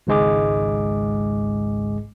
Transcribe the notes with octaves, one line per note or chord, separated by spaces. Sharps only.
G#1 C#2 G#2 G#3 G#4 D6